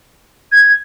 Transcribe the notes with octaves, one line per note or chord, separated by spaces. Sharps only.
G#6